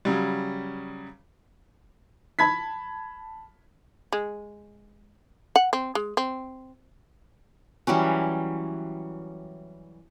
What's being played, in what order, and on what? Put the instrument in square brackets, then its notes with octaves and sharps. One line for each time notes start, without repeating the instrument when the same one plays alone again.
[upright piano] C#3 F#3 G3
A5 B5 G#6 B6
[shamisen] G#3
F#5
C4
G#3
C4
[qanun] E3 F#3 G3 C#4